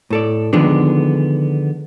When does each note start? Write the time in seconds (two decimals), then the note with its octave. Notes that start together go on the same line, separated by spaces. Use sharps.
0.10 A2 A4 D5
0.53 D3 D#3 F3 G#3 B3 D4